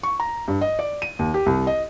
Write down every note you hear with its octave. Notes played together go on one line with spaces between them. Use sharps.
C#6
A#5
G2
D#5
D5
D#7
D#2
G4
C2
D#5